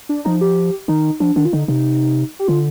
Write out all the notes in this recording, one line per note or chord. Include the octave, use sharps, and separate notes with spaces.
D4
F3 D#4
G4
D#3 D#4
F3 D4
D#3 D4
F4
D3 D#4
C3 D#4
G4
D3 F4